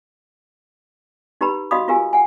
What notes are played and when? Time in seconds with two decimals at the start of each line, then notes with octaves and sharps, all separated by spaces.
1.41 D#4 G4 B4 A#5 B5
1.71 F#4 D#5 F5 B5 D#6
1.88 F4 G4 A#4 F5 G#5
2.13 F#5 G#5